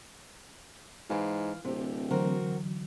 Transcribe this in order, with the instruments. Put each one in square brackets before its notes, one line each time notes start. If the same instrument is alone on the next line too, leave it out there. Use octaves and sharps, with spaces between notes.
[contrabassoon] G#2 [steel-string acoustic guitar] E3 F5
[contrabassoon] D1 [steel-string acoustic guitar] C3 G4
[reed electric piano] D3 E3 F#3 [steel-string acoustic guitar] C4 F#4 A#4